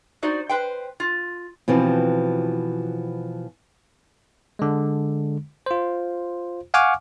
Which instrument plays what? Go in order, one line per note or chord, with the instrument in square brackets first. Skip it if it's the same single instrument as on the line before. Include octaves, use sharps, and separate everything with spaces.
[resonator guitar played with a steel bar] D#4 F#4 C5 D5
B4 C5 G5
F4
[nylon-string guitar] B2 E3 F3 C4
[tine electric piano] D3 G#3
F4 C5
F5 F#5 G#5 C#6 D6 F6